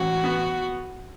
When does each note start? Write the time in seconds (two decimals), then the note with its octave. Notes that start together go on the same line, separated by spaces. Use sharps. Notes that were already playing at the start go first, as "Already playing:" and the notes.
Already playing: A1 F#4
0.24 B3